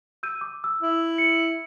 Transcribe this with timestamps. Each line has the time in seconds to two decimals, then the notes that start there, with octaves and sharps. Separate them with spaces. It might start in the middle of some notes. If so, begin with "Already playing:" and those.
0.23 E6 G6 D#7
0.41 D6
0.64 E6
0.82 E4
1.18 C#7